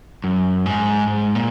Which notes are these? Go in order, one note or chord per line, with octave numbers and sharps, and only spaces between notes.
F#2
G#2
G#2
A#2